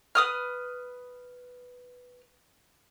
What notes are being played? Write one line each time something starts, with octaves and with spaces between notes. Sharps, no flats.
B4 D#6 F6